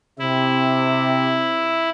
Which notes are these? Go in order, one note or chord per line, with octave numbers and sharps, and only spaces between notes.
C3 E4